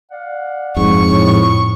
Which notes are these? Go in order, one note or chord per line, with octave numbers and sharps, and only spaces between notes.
D5 F5 F#5
F2 G#2 C#6
A2